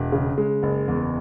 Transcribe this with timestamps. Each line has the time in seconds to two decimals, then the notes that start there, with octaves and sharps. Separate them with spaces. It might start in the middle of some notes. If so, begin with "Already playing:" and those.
Already playing: E1
0.12 C#3
0.38 G#3
0.63 F#1
0.88 E2